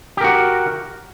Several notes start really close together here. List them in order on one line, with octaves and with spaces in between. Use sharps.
G4 A#4 F#4